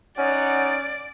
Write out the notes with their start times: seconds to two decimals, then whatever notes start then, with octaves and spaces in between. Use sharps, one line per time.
0.18 C#4 D#4 D5 F#5